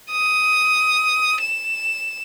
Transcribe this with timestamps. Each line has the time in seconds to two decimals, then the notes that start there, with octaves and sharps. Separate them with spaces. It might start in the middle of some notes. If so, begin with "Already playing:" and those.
0.11 D#6
1.42 E7